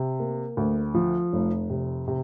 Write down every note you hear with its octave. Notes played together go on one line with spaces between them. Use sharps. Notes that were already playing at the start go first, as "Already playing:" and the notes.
Already playing: C3
A#3
D2
F3
F1
C3
C3